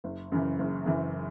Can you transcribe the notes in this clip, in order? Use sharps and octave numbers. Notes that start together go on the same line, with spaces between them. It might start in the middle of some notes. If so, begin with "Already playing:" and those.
F#1
F#2 C#3 E3
F#1
F#2 C#3 E3